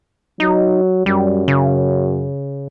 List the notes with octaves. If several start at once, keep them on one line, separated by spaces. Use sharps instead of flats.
F#3 D#4
F#2 G3
C#3